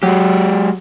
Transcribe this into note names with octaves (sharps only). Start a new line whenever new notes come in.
F#3 G#3 G4